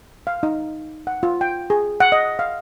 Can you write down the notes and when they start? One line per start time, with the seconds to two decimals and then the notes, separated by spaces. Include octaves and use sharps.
0.27 F5
0.43 D#4
1.07 F#5
1.23 F4
1.41 G5
1.70 G#4
2.00 F#5
2.12 D#5
2.39 F5